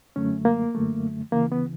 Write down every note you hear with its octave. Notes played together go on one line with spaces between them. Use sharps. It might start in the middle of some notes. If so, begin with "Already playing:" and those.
F#2 D3 F#3 A3 C#4
A#3
F#2 D3 F#3 A3
D2 C#3 E3 A#3
B3